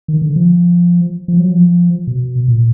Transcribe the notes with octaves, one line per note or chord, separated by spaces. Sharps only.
D#3
D3
F3
F3
F#3
F3
B2
A#2